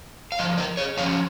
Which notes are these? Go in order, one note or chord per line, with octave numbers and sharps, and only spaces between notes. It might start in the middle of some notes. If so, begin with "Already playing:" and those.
F5
G#2 F3 D#5
A#4 D#5
G#4 C#5
F2 F3 C#4 C#5 F5